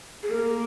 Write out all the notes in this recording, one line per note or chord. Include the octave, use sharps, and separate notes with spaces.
G#4
A#3 A#4